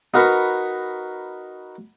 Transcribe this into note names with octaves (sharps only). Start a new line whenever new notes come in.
D#4 F#4 A#4 B4 B5 C#6